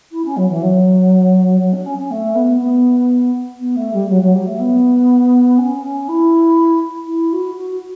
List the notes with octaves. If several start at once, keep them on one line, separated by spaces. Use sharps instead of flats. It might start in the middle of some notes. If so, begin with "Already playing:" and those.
E4
C#4
F#3
E3
F#3
F#3
D4
C#4
C#4
A3
B3
B3
B3
A3
G3
F#3
F#3
G3
A3
B3
C#4
C#4
E4
E4
F#4
F#4